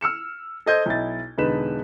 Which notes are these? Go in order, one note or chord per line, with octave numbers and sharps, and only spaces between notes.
E6 F6 C#7 E7
A4 C5 D#5 G6 G#6
B1 E4 D#5 A6
E1 D3 D#4 B4 E7